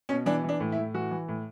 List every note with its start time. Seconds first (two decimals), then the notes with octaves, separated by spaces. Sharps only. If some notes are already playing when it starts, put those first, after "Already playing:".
0.09 B2 C#4
0.26 E3 D4
0.44 E3
0.49 D4
0.60 A2
0.72 E4
0.77 A2
0.94 E3 F#4
1.11 E3
1.28 A2